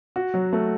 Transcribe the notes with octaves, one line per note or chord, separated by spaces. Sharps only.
F#4
F#3
A3